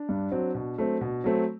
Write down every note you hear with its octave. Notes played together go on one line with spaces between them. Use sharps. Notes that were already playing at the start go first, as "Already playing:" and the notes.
Already playing: D4
G2
F#3 C4
B2
F#3 A3 C4
B2
F#3 A3 C4